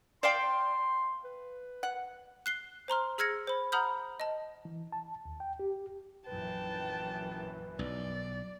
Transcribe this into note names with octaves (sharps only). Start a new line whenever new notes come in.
C5 D5 F5 G5 C6
B4
F#5
F#6 C7 G7
C5 A#5 C6 F6
G#4 E6 F6 G#6 A#6 C#7
C5 B5
F#5 A#5 B5 D#6 F6 G6
D#5 A5
E3
A5
D#2
G5
G4
A#1 F#2 E3 B4 G5 A5
B1 D5